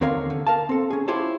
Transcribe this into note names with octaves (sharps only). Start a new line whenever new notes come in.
D#2 D3 C4 A#4 C#5 F5
D3
A#4 F5 A5
C4 A4
C#4 G#4
E4 F4 G4 C5 C#5 A5